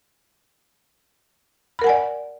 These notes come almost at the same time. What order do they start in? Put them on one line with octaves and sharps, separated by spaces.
B5 A#4 F#5 G#5 D5